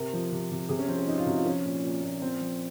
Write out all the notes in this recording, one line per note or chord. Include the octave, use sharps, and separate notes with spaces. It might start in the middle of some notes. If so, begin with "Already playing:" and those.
Already playing: C3 A#4
F3
C3
C3
C3 G#4
C#4
F3 C4
C#4
F3 D#4
F4
C3 F#4
F4
F3 C#4
A#2
A#2
A#2
F3 C4
F3